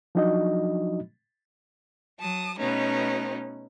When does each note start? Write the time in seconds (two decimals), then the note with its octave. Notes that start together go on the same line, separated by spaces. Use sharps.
0.15 F3 F#3 D4 D#4 F#4 D#5
2.18 F#3 A5 D#6
2.59 B2 A3 B3 C#4 D#4